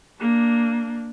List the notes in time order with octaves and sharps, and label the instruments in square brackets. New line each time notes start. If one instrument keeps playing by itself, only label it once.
[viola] A#3 D4